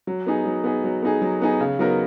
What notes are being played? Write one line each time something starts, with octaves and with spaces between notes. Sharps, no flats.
F#3
B3 D#4 G#4
F#3
B3 D#4 G#4
F#3
B3 D#4 G#4
F#3
B3 D#4 G#4
C#3
F#3 B3 D#4 A#4